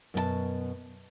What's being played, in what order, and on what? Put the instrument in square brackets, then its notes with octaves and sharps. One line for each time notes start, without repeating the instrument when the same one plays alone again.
[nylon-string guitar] F#2 B2 F#4 A5